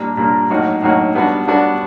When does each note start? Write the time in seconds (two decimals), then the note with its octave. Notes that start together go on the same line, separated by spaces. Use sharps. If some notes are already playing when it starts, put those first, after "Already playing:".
Already playing: A#2 G3 A#3 D4
0.17 A#2 G3 A#3 D4
0.50 A2 F#3 A#3 D#4 F#4
0.82 A2 F#3 A#3 D#4 F#4
1.15 G3 B3 D4 F#4
1.47 G3 B3 D4 F#4